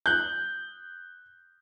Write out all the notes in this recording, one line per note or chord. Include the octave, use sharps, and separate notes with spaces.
F#6 G6